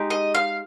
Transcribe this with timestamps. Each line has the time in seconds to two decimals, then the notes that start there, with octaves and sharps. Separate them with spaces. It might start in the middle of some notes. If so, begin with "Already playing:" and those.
Already playing: G#3 D#4 G4
0.10 D#5
0.35 F5